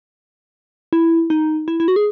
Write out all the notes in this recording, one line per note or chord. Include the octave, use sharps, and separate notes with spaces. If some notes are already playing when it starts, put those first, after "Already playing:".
E4
D#4
E4
E4
F#4
G#4